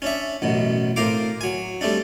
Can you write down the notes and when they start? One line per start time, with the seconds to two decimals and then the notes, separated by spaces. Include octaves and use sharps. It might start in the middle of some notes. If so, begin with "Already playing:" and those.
0.02 C#4 D4 E5
0.42 A1 F#2 B2
0.96 A2 C4 A#4 C5 F5 D6
1.41 F#3 G#5
1.81 G3 A3 C4 D4